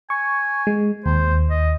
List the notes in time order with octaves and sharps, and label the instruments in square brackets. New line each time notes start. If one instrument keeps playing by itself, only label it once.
[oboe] G#5 [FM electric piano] C#6
[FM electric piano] G#3
[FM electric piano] D#2 [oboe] C5
[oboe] D#5